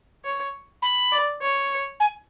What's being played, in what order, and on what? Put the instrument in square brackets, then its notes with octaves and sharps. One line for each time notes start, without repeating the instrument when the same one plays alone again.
[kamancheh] C#5
[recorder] B5
[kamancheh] D5
C#5
[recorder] G#5